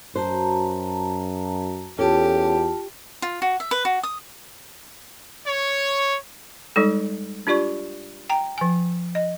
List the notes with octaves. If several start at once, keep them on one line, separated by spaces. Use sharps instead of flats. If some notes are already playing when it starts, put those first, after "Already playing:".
F#2 F#4 C5 A5 A#5
E2 C#4 F4 G4 A4 A5
F4
F#4
E5
B4
F#4
D#6
C#5
G3 G#3 D#4 A4
D4 F4 G4 D5 C#6
G5 A#5
F3 G#5
D#5